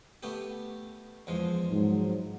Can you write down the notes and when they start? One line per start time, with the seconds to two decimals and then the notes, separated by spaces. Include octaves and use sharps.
0.23 A3 B3 G4
1.27 E2 F3 G#3
1.71 G#2 F#3